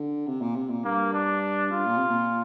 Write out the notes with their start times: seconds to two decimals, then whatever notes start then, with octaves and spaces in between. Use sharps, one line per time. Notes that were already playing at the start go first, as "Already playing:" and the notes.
Already playing: D3
0.27 C3
0.41 A#2
0.56 C3
0.70 A#2
0.85 G2 A#3
1.13 D4
1.72 G2 F4
1.86 A#2
1.98 C3
2.09 A#2